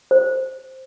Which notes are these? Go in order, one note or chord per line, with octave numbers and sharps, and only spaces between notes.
C5